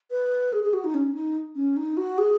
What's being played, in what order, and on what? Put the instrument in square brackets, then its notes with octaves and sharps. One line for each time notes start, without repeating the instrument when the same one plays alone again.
[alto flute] B4
G#4
G#4
F#4
D#4
C#4
D#4
C#4
D#4
F#4
G#4